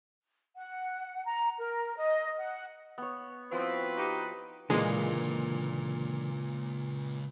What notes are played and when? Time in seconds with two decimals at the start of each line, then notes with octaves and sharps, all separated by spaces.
0.56 F#5
1.25 A#5
1.58 A#4
1.97 D#5
2.39 F#5
2.98 B3 C#5
3.52 F3 C4 E4 F#4 B4
3.97 D#4 G4
4.70 C#2 A#2 D3 E3 G#3 A#3